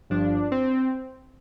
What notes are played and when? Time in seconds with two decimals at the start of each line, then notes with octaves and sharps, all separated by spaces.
0.10 G1 G2 F3 D4
0.52 C4